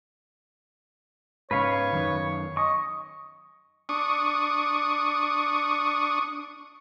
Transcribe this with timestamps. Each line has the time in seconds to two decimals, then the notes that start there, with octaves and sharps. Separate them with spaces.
1.51 G#2 C#3 B4 C#5 F5
1.92 F#2 D#3
2.57 D#5 C#6
3.89 D4 C#6 D#6